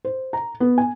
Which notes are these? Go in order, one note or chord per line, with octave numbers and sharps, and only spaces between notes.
C5
A#5
B3
G#5